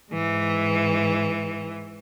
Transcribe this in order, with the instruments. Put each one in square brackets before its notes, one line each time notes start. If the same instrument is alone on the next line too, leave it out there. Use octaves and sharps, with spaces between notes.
[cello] G#2 E3